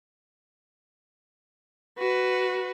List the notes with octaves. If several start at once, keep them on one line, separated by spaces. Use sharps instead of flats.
F#4 B4